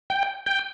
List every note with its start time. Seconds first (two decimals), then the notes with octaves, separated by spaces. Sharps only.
0.10 G5
0.46 G5